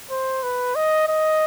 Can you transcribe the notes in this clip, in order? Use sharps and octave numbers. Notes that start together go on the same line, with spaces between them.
C5
B4
D#5
D#5